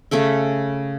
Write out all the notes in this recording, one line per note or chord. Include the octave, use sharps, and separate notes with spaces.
C#3 A3 A4 E5